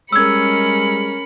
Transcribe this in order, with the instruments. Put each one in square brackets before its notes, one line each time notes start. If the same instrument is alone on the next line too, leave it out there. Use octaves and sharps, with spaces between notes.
[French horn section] G3 G#3 [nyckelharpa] C#4 A#4 [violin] B5 C#7 [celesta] E6 G#6